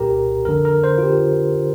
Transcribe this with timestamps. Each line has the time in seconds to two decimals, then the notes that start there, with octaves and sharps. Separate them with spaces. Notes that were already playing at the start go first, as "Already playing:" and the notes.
Already playing: C2 A#2 G4 A#4 A#5
0.45 F2 D3 A#4
0.65 A#4
0.84 C5
0.98 F4
1.03 G4